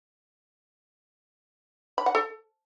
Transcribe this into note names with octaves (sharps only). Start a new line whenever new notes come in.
B5
F#5
A4